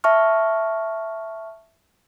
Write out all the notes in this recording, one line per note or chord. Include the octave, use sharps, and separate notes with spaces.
E5 A5 C#6 F6